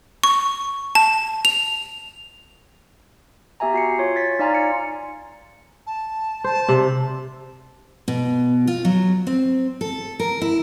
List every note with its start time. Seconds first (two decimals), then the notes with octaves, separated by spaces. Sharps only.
0.24 C#6
0.95 A5
1.45 F7
3.60 B3 G4 E5 G#5 A#5
3.74 F#4 C7 C#7
3.99 F4 C#5
4.16 A6 B6
4.39 D#4 D5 F5 G#5 A#5 C6
4.55 C#7
5.86 A5
6.44 C5 A5
6.69 C3
8.08 B2
8.67 F4
8.85 F#3
9.27 C4
9.81 A4
10.20 A#4
10.41 E4